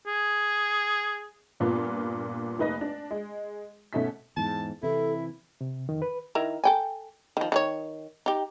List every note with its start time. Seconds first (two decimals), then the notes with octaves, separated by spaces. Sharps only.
0.06 G#4
1.60 G2 A#2 B3 F4
2.59 F1 A#3 D#4 B4 D#5 A#6
2.81 D4
3.11 G#3
3.93 B2 A3 C#4 D#4 B6
4.37 E2 G#2 A5
4.83 C3 E3 E4 A4
5.61 C3
5.89 F2 D#3
6.02 B4
6.35 D#3 E4 A#4
6.64 A4 G5 G#5
7.37 D#3 F3
7.52 D#3 G#4 C#5
8.26 D#4 G4